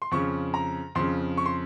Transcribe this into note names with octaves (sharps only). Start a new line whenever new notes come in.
C6
F2 C#3 C#6
A#5
F2 C#3 C6
C#6
C6